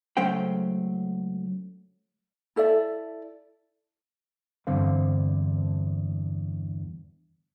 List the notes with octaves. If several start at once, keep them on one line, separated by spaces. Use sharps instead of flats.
C#2 F#3 A3 C#4 C5 G5
E4 A4 D5 E5
E2 G2 D3 C4 F5